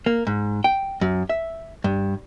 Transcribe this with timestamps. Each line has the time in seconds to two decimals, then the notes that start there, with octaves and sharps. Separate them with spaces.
0.06 A#3
0.27 G#2
0.64 G5
1.01 F#2
1.29 E5
1.84 G2